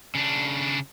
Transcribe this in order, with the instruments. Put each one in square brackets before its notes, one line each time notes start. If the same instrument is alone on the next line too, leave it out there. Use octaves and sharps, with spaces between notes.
[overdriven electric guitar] C#3 D4